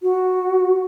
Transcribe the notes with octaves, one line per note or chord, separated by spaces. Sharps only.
F#4